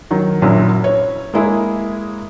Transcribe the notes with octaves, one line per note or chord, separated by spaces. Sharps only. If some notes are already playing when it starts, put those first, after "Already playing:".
D#3 F#3
A#1 F#2 A#2 F#3 E4
C#5
G#3 A#3 E4 G#4